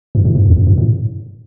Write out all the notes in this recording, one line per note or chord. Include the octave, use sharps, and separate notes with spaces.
G2
A2
G2
E2
F#2
G2
A2